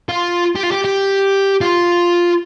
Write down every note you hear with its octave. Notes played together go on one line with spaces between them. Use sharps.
F4
G4
F4
G4
G4
F4